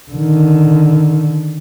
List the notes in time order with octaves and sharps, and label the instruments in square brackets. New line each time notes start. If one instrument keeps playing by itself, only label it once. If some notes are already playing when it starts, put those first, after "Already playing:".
[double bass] D3 D#3